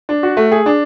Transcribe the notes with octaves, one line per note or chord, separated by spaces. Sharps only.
D4
F#4
A3
G#4
D4